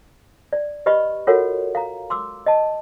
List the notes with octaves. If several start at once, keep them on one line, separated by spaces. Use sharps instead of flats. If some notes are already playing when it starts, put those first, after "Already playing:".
D5
G4 B4 D#5 B5 C#6
F4 F#4 A4 A#4 C#5 F#5
F5 A#5
C6 D6 E6
D#5 A5